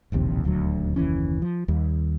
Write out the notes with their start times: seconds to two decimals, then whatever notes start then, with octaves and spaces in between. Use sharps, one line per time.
0.12 E1 A#1 D#2 C3
0.44 D#1 D2 D3 F#3
0.96 F#1 D#2 E3 C#4
1.42 F3
1.68 D#2 G3